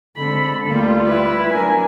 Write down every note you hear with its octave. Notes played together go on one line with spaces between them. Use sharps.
D3 G#3 C4 A4 B5
D2 G3 A#3 F4
E4 B4
F#3 B3 D4 A#4 G#5